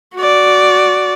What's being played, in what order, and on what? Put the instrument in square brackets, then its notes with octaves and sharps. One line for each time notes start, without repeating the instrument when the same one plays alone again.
[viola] F#4 D5